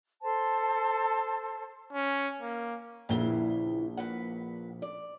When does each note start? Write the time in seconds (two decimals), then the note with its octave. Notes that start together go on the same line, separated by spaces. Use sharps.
0.22 A4 C5 A5
1.93 C#4
2.41 A#3
3.09 A#1 A#2 C#3 E3 G7
3.97 A#2 B4 F#5
4.82 D5